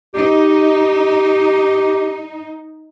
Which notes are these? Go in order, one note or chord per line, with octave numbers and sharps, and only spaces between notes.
D#4 G4